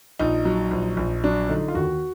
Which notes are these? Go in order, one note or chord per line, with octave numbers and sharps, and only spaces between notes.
A#1 D#4
F#3
A#1
A#1
F#3 D4
D3 D#4
F4
D#2 F#4